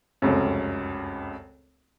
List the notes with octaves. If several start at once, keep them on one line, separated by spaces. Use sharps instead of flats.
F1 C#2 F#2